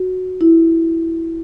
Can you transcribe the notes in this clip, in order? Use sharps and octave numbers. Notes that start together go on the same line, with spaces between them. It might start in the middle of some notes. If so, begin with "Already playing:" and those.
Already playing: F#4
E4